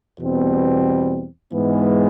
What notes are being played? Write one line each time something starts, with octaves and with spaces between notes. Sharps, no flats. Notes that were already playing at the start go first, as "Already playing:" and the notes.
E2 B2 G3 C4
G#2 E3 G#3 B3